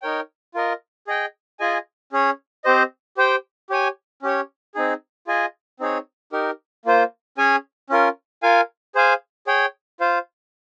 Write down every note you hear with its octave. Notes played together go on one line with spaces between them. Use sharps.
D#4 A#4 C#5 G5
F4 A#4 D#5
G#4 D#5 G5
F4 G#4 D#5 G#5
C#4 G#4 C#5
C4 G4 C5 D#5
G4 C5 G5
G4 C#5 G#5
C#4 G4 C#5
C4 D#4 G#4
F4 G#4 D#5 G#5
C4 D#4 G#4 C#5
D#4 G4 A#4
A#3 F4 C5
C#4 G#4 C#5 G#5
C#4 F4 A#4
F4 A#4 F5 G#5
G#4 C5 F5 G#5
G#4 C#5 G5
F4 C5 F5